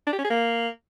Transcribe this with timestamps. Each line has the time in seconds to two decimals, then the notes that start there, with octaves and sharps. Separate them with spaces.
0.07 D4
0.13 G4
0.18 C#4
0.24 G#4
0.30 A#3